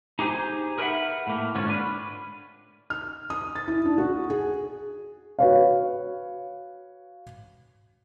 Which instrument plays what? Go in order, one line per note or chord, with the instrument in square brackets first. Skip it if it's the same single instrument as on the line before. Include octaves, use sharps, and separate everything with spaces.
[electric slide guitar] D#4 G4 G#4 C5
G#4 A#4 B4 C#5 E5 F#5
A2 A#3
G#2 D3 C#4 F4
D4 B4
[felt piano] F6
D#6
A6
E4
D4
F#4
G#4
[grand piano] F#4 B4 C#5 F5